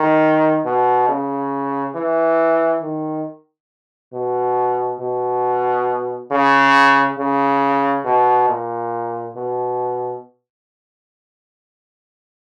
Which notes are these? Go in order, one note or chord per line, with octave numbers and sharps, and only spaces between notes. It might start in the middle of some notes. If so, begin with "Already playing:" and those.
Already playing: D#3
B2
C#3
E3
D#3
B2
B2
C#3
C#3
B2
A#2
B2